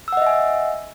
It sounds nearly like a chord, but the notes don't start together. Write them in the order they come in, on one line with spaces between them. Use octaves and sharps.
E6 F#5 D#5 E5 G#5